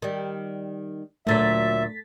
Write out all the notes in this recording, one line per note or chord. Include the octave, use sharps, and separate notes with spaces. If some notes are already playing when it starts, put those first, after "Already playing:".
D#3 G3
D2 A#2 F#3 A3 E5 A6 B6